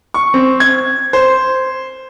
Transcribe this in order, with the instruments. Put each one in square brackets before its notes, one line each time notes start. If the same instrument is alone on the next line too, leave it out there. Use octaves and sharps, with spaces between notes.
[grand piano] C#6
C4
G#6
C5